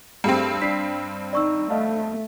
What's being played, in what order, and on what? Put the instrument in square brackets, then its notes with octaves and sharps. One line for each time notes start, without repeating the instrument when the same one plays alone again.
[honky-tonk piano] G2 C4 [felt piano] A3 G4 G#4
[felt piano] D4 [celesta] B6 C7
[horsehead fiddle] D#4 [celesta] D5 C#6 E6
[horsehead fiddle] A3 [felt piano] D#5 F5 A5